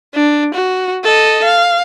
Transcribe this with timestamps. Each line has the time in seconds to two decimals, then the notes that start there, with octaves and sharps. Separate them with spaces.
0.14 D4
0.55 F#4
1.04 A4 D#5
1.44 F5